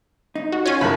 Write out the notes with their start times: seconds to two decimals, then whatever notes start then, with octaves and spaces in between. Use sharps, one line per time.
0.35 D#4
0.52 F#4
0.66 C#4 F4 G#5
0.81 F#1 A#4 A5 B5